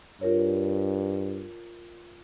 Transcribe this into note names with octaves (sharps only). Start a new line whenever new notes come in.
G2 F4 A#4 C#5